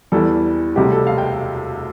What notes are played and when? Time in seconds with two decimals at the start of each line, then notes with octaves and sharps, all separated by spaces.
0.12 E2 E3 G3 A4
0.76 E1 D2 C3 G3 G4
0.92 A4
1.07 F5
1.18 G5